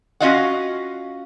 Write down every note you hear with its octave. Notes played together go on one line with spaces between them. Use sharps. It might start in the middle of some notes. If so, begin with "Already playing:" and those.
C#4 F4 F#4 D#5 F5 F#5